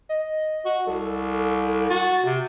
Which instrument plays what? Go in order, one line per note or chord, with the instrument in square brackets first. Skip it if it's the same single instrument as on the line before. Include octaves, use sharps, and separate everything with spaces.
[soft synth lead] D#5
[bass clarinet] F#4
[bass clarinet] C2 [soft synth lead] A4
[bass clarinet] F#4 [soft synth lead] A6
[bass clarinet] C3 [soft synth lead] F#4